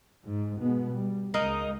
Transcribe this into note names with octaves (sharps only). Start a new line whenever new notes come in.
G#2
B2 G#3 B3
G3
C#2 G#3 A#3 D#4 A#4